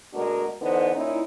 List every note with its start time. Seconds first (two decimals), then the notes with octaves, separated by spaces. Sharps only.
0.14 D2 B2 G#3 D4 F#4 A#4
0.61 D3 E3 B3 D#4 C5
0.94 A#2 C#4 D#4 E4